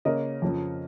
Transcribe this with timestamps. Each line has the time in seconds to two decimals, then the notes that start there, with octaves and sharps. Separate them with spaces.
0.05 C#3 A#3 C#4 A#4 D#5
0.42 F2 C#3 F3